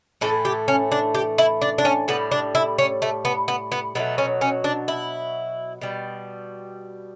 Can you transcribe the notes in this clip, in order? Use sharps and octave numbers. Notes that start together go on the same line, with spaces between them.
A2 E3 A3 A4
G4
C#4
D4
G4
E4
D4
D4
C#4
A2 G3 B3
D4
E4
C#4
A3
B3
B3
B3
B2 F#3 A3 B3
C#4
C#4
D4
E4
B2 G3